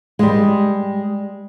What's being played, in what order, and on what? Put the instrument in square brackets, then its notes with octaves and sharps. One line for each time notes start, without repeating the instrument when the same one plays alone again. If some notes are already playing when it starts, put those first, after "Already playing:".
[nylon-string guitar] G3 G#3